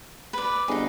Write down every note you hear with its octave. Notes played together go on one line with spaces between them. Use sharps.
B4 D5
G1 D#4 G#4